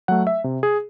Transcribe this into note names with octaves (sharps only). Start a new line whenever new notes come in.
F#3 A3 F#5
E5
C3
G#4